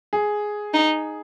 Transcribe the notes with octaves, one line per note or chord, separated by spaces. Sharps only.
G#4
D#4